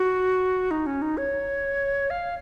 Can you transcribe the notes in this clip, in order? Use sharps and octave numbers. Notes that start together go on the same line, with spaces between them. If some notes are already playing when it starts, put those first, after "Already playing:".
Already playing: F#4
D#4
C#4
D#4
C#5
F5